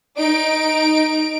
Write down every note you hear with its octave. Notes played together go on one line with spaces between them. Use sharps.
D#4 D7